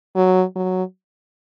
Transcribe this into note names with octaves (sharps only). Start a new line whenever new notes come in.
F#3
F#3